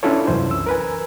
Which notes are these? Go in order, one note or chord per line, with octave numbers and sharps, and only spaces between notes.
C#4 D4 E4 F4 A4 C#5
C2 F#2 E3 C5
E6
A#4 B4 G#5